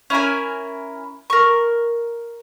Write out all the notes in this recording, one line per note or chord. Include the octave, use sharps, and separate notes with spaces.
C#4 E4 A#4 G#5
A#4 C#6